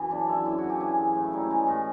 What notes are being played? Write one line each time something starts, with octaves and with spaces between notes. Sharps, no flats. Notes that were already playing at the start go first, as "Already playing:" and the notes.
Already playing: F#2 E3
C#3 D4
F#2 E4
F#2 E4
F#4
E3
G4
C#3 G#4
F#2
A2
E4
G3 D#4
C#4
E3 G#3
A2